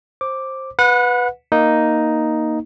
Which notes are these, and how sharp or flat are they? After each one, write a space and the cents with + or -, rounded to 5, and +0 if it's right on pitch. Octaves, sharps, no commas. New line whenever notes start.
C5 +15 D6 +0
B4 +0 F#5 -30
A#3 +0 D#4 +0